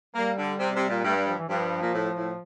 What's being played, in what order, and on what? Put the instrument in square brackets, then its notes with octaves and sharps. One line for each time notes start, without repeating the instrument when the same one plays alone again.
[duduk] G3 [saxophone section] A#3
[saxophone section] D3
C3
C3
A#2
[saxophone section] G2 [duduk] A3
[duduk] G3
F3
E3
[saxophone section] G2 [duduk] F3
[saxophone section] A#2
A2
A2